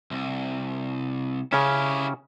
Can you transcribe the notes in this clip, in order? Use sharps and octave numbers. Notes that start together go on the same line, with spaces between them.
C2
C#3 C#4 E4 G4